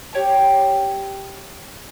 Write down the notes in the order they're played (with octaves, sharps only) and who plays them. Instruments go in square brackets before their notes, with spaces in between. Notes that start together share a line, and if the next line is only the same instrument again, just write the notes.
[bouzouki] G4 C#5 G5 A5